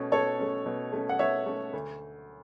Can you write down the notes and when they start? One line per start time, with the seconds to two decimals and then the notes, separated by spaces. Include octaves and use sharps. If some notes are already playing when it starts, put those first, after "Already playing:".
Already playing: B2 A3 C#4
0.12 B2 A4 C#5
0.39 A3 C#4
0.66 B2
0.93 A3 C#4
1.09 F#5
1.19 B2 C#5 E5
1.46 A3 C#4
1.73 D2